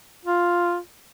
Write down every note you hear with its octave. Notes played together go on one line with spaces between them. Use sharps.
F4